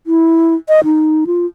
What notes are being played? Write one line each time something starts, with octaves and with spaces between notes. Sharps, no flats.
E4
D#5
D#4
F4